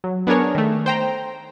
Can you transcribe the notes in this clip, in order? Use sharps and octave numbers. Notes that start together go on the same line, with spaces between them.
F#3
B3 D4 G#4 A#4 C#5
D#3 A3
C5 G5 A#5